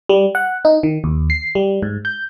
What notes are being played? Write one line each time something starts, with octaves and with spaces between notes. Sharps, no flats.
G3
F#5
D#4
D#3
D#2
C7
G3
G#2
G6